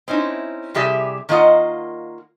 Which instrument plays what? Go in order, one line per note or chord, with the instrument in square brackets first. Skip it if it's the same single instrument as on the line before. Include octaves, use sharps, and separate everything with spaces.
[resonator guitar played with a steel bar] C4 C#4 D#4 E4
C3 G3 G4 G#4 E5
D#3 A#3 F4 D#5 F#5